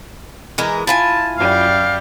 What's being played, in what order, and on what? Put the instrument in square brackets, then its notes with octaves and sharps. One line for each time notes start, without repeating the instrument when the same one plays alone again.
[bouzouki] E3 G#3 A#4
[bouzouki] E4 F4 G#5 [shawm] A5
[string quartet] F#2 G3 [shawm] F5